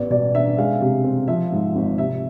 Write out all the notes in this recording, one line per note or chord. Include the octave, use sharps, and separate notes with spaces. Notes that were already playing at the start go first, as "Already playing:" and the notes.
Already playing: A1 B3 D5
B2 D5
D4 E5
G#3 F5
C3
C4
F3 E5
G#2
G#1
C3 E5